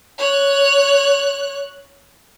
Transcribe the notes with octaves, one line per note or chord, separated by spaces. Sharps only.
C#5 F#6